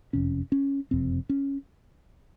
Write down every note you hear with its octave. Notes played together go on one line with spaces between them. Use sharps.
F#1 F2 C3 C#4
C#4
F#1 F2 C3 C4
C#4